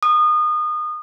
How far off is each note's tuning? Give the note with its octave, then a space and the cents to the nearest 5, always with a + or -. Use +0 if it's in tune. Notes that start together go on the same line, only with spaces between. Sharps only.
D#6 -30